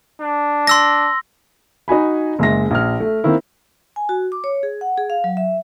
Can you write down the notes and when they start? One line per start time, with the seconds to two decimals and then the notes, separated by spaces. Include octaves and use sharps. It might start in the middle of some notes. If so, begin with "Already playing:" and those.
0.21 D4
0.67 C6 E6 A#6
1.88 D#4 F#4 G#5 B5
2.39 F#1 G#3 E5 A#6
2.71 A#1 F6
3.00 A3
3.24 D#3 A#3 C4 E4
3.96 G#5
4.09 F#4
4.32 D6
4.44 C#5
4.63 G#4
4.81 F#5
4.98 G#4
5.10 F5
5.24 F#3
5.37 E5